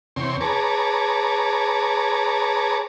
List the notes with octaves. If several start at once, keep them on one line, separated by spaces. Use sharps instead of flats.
E2 C3 C4 C#5 C6
G#4 B4 C#5 A5 A#5 D6